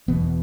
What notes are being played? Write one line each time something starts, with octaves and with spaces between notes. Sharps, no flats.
E1 E2 B2 B3